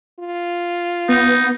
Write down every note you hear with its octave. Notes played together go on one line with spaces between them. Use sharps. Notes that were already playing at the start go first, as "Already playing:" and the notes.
F4
B3 D#4